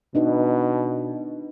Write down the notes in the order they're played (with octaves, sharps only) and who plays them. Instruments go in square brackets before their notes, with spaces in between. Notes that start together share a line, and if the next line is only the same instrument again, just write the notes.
[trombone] B2 [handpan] D4 D#4 B4